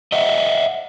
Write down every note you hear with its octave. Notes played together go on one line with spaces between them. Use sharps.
D#5 E5 F#5